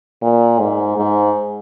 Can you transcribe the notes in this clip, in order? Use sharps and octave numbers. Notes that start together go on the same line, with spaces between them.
A#2
G#2
G#2